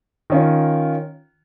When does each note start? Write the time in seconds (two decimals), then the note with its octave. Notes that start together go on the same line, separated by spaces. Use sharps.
0.30 D#3 C#4 F4